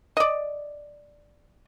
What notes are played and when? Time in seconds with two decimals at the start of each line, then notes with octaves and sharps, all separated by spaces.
0.17 D5 D#5